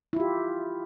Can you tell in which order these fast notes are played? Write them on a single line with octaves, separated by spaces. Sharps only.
E4 F4 G4